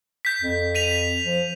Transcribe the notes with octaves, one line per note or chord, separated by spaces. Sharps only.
G6 B6
F2
B6 D#7 F7
B6
F3